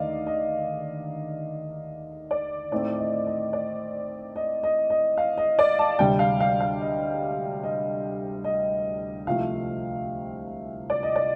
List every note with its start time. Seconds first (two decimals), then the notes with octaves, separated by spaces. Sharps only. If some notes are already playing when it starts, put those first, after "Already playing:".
Already playing: D#2 D3 A3 D#4 D5 D#5 F5
0.27 D#5
2.31 D5
2.72 A2 A3 C4 D#4 D5
2.98 D#5
3.27 D#5
3.53 D5
4.36 D#5
4.63 D#5
4.90 D#5
5.17 F5
5.37 D#5
5.59 D5
5.79 A5
5.99 D2 C3 G3 G5
6.19 F5
6.40 F5
6.60 F5
6.81 D#5
7.63 D#5
8.44 D#5
9.27 C2 C3 F3 A3 F5
10.90 D5
11.03 D#5
11.16 D5